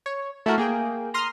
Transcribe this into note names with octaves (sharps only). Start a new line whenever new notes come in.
C#5
A3 E4 F#4 A#4
A#3 G#4 G5
A#5 C6 D#6 F6